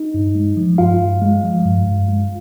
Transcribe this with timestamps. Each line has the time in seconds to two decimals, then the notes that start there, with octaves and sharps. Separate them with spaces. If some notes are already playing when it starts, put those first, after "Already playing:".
Already playing: D#4
0.14 G2
0.35 G#3
0.57 F3
0.78 G2 F4 F5
1.00 G2
1.22 G#3
1.44 F3
1.65 G2
1.86 G2
2.08 G#3